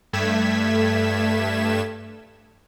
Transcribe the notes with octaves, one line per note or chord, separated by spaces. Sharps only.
G2 A3 G#6 B6 E7